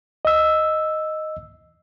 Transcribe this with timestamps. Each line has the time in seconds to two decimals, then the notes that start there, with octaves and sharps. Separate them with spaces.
0.25 D#5 E6